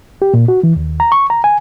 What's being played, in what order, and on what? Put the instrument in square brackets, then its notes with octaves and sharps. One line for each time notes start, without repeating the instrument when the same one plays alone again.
[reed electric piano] G4
A#2
F#4
E3
D#2
A#5
C#6
A#5
G#5